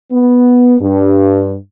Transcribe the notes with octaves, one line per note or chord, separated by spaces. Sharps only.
B3
G2